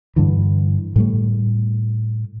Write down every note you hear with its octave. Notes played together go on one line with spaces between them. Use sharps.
G2 D3 E3
A2 G3 A3